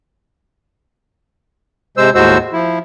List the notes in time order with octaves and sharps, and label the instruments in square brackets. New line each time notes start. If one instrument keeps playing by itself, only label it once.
[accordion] C3 G#3 C5 E6
D#2 A2 G#3 F#4 C5 E6
F3 E4